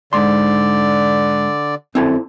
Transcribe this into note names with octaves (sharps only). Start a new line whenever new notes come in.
G#2 D3 D5 C6
F#2 C4 E4 A4